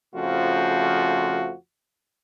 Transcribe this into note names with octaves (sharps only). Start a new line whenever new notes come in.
F2 C#3 F3 A3 F4 F#4